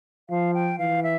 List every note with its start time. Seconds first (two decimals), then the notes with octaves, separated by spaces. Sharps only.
0.30 F3 F5
0.54 G5
0.79 E3 F5
1.03 E5